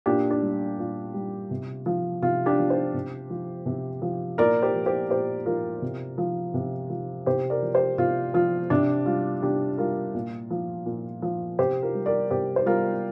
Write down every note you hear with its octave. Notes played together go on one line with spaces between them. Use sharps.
A#2 D4 G4
D4
G3
A#2 F4
G3
C3
F3
C3 F4
D4 G4
F3
G4 C5
C3
F3
C3
F3
A#2 A#4 D5
G4 C5
F3
G4 C5
A#2 G4 C5
F3 F4 A#4
C3
F3
C3
F3
C3 G4 C5
A#4 D5
F3
G4 C5
C3 F4
F3 F4
C3 D4
G3 F4
C3 D4 G4
G3 F4 A#4
A#2
F3
A#2
F3
C3 G4 C5
F4 A#4
G3
A#4 D5
C3 G4 C5
C5
G3 F4 A#4